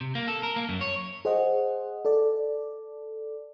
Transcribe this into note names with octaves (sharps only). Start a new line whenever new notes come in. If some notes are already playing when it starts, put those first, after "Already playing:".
C3
A#3
A4
A#4
A#3
F#2
C#5
G#4 C5 D#5 F#5
A4 D5